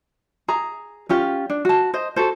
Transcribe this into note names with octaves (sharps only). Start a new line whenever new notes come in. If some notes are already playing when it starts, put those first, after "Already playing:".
G#4 A#5
C#4 F4 G4
D4
F#4 A5
C5 D#5
F#4 A4 C5